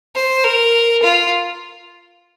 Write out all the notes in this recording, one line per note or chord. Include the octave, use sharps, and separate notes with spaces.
C5
A#4
F4